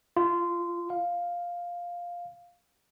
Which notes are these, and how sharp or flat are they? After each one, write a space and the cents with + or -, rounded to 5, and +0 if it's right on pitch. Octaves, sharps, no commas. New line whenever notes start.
F4 -20
F5 +5